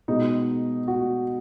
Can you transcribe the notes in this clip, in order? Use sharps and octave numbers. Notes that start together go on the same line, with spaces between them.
B2 G#3 D#4
F#4